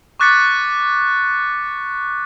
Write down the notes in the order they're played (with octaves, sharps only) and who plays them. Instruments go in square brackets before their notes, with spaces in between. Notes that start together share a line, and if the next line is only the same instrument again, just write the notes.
[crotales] C#6 D6 F#6 A6 B6 C#7